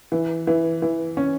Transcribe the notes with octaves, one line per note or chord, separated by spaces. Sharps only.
E3
E3
E3
C#4